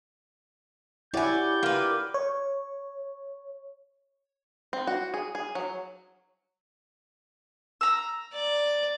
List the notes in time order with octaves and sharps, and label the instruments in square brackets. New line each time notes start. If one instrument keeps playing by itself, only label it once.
[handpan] E4 C#5 F#5 [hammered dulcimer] G4 [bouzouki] D5 G#5 [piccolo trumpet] G6
[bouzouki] A#3 B4 [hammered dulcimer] F4 D5 F5
[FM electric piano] C#5
[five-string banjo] C4
F#4
G#4
G#4
F#3
[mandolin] A#5 E6
[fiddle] D5